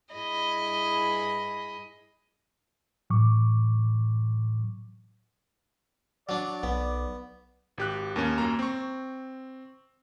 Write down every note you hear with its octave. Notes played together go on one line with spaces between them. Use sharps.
G2 E4 G#4 D#5 B5
A2 E3 F#3 C#6 D6
F#3 D4 D5
B1 B3
G#1 G4 F#6
D#2 A#3 C#4
F#2 A#3 A#5
C4 C#6